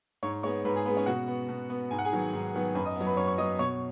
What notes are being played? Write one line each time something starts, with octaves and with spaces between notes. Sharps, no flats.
G#2 C#5 C#6
G#3 B3 C#5 C#6
G#2 B4 B5
G#4
B3 B4
G#3
C#4 C#5
B2 F#4 F#5
B3
B2
B3
G#2 G#5
F#5
G#4 G#5
D#3 F#3 B3
G#2
D#3 F#3 B3
F#2 B4 B5
D#5 D#6
F#3 B3
B4 B5
F#2 C#5 C#6
C#6
F#3 B3 D#5 D#6
B2 C#5 C#6